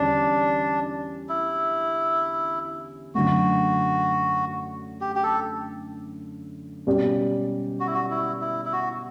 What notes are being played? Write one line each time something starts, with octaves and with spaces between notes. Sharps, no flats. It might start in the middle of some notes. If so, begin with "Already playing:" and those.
Already playing: E2 D3 G3 C#4 D4 G4
E4
F#2 D3 F#3 A3 F#4
G4
G4
A4
B2 G3 C#4 G4 D5
F#4
E4
F#4
E4
E4
E4
F#4